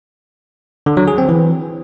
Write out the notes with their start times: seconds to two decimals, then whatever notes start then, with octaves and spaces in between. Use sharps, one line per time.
0.86 D3
0.97 F#3
1.08 G#4
1.18 C4
1.29 E3